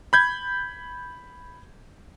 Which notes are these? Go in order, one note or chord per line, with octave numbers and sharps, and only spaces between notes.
B5 G6 G#6